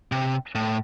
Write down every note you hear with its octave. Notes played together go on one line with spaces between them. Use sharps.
C3
A2